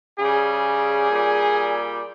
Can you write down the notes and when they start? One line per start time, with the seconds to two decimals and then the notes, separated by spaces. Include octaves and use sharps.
0.19 C#3 G3 G#4
1.09 A#2 G3